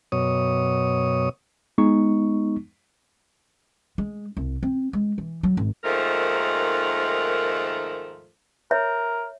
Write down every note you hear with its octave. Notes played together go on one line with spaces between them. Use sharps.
F#2 B2 C#5 D#6
G#3 B3 D#4 C#6
G#3
C2
C4
G#3
E3
F#3
G#1
D#2 G#2 D#3 F3 A3 A#4
A#4 C#5 E5